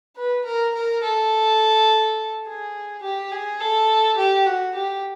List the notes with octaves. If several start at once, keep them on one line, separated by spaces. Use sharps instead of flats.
B4
A#4
A#4
A4
G#4
G4
G#4
A4
G4
F#4
G4